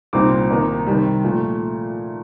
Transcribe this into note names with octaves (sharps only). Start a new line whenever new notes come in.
C2 A#2 G3 C4 D#4 D6
C2 C3 D#3 A#3 D#4
C3 D#3 G3
A#2 F3 A3